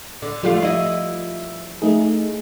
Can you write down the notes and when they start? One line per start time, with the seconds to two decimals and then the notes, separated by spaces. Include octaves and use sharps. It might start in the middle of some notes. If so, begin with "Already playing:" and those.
0.22 D3
0.43 F3 G3 A3 F4
0.62 E4 D#5
1.82 A3 D#4 G#4